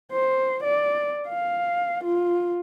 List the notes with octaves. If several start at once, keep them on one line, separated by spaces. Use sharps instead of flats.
C5
D5
F5
F4